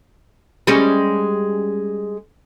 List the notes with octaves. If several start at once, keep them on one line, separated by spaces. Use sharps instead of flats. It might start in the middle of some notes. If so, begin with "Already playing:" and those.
G3 G#3 C#4